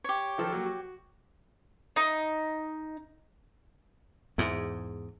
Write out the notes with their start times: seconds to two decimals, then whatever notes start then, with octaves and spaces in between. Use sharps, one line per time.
0.04 G4 C#5
0.38 D#3 F3 A4
0.52 F#3 A#3
0.66 F#4
1.96 D#4
4.38 E2 G#2